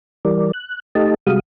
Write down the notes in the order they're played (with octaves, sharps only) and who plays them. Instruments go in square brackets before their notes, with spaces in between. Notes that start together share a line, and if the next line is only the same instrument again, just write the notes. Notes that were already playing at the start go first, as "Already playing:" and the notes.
[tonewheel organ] E3 G3 A#4 D5
F#6
A3 D#4 G4 D#5 A5
C3 G3 G#3 F#4 F5 D#6